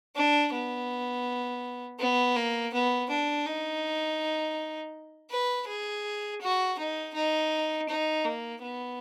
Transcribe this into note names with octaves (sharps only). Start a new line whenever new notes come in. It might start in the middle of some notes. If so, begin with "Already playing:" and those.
D4
B3
B3
A#3
B3
D4
D#4
B4
G#4
F#4
D#4
D#4
D#4
A#3
B3